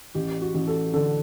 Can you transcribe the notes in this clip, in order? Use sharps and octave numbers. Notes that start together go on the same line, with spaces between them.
A1 G4
F#4
A1
A4
D3 A4